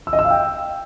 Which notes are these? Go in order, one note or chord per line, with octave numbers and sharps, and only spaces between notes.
E6
D#5
E6
F5
G5